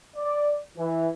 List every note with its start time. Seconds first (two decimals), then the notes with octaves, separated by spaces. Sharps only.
0.15 D5
0.77 E3